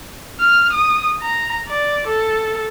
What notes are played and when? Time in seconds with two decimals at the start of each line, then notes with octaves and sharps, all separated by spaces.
0.40 F6
0.73 D#6
1.22 A#5
1.68 D5
2.07 A4